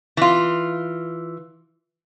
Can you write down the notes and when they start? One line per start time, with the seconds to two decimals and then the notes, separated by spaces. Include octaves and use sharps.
0.17 E3 F4